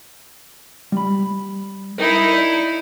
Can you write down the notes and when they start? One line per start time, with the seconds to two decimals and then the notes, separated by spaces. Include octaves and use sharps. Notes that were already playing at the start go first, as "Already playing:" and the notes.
0.92 G3 B5
1.98 D#4 E4 A#4 D#5
2.33 D5